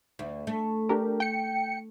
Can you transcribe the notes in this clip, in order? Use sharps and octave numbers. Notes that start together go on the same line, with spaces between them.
D2
A3
D4 G4 A#4
G5 C#7